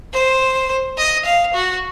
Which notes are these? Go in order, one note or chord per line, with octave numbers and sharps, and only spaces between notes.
C5
D#5
F5
F#4